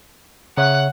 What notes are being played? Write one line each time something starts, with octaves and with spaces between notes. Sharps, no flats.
C#3 C#5 E5 F#5 F#6